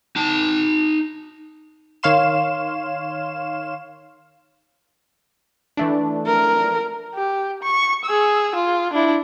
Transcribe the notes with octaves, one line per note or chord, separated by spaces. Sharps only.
D#4 A5
D#3 C#5 F5 C6 E7
E3 A3 D4
A#4
G4
C#6
G#4 E6
F4
D4 E4